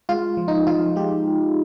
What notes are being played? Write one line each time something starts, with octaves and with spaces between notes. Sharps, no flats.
G#3 F4
F3
D#4
F3 F4
G#3 G4